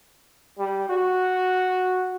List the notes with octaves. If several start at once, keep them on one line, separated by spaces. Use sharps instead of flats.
G3
F#4